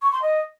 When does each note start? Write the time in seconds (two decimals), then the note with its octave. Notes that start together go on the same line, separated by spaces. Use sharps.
0.02 C#6
0.12 C6
0.22 D#5